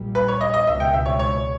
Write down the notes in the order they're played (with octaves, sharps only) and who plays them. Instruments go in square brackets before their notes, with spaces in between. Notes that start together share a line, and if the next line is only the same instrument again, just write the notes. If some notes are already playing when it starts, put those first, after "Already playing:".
Already playing: [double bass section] A#1 A#2 G3
[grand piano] B4
C#5
D#5
D#5
[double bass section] C#2 B2 G#3 [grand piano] E5
[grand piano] G5
E5
C#5
C#5